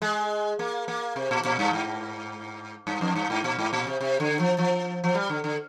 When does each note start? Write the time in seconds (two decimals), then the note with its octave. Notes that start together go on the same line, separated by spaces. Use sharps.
0.02 G#3
0.59 A#3
0.88 A#3
1.16 C3
1.31 A#2
1.45 A#2
1.59 G2
1.73 G#2
2.87 G2
3.01 F2
3.15 G2
3.30 G#2
3.44 A#2
3.59 G#2
3.73 A#2
3.87 C3
4.01 C3
4.20 D3
4.39 F3
4.58 F3
5.04 F3
5.15 G3
5.29 D3
5.44 D3